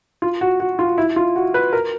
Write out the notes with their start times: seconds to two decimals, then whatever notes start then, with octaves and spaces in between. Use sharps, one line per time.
0.22 F4
0.41 F#4
0.60 F#4
0.79 F4
0.98 E4
1.16 F4
1.36 F#4
1.54 B4
1.73 A#4